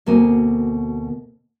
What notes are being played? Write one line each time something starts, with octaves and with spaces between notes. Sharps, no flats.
D2 B2 A#3 C4 G#5